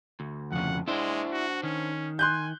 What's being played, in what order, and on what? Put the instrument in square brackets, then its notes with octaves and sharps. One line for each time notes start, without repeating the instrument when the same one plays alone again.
[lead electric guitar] D2
[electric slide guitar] F2 C#3 [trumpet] F#5
[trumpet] G#3 [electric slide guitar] D4 C5 [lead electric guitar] E4
[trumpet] F#4
[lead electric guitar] D#3 [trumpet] C#4
[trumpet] G#5 [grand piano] C6 F#6 G6